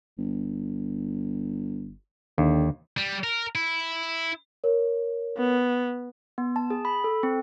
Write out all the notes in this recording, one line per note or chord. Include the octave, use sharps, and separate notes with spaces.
G1
D#2 D3
G3
A#4
E4
A#4 C#5
B3
B3
A5
G#4
B5
A4
C4